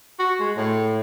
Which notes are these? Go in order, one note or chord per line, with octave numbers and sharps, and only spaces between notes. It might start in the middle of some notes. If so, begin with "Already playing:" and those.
F#4
G#3
A2